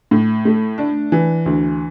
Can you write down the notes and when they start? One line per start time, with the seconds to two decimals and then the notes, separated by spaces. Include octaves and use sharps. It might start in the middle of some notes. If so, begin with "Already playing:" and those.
0.11 A2
0.45 A3
0.78 D4
1.12 E3
1.46 D2